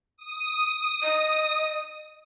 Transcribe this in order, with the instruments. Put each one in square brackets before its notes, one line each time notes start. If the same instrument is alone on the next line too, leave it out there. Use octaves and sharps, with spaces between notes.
[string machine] D#6
[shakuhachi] D#5